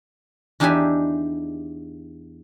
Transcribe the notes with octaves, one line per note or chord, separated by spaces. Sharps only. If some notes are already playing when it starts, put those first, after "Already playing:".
E2 D4 D#4 G4 E5 G#5